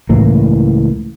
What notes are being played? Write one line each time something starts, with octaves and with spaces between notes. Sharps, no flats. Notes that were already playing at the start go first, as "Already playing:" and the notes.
C#2 A2 E3 A#3